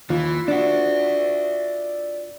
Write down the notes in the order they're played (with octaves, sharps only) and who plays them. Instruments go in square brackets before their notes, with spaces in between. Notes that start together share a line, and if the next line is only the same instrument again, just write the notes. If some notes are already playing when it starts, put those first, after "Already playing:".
[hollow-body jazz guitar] D#2 [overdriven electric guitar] E3 [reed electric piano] F4
[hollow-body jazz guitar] D4 F#4 [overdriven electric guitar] D5 E5